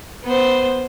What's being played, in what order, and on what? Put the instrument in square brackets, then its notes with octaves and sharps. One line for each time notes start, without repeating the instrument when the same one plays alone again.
[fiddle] B3 C5